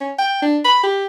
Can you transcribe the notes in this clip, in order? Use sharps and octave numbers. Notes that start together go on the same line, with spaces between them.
C#4
G5
D4
B5
G4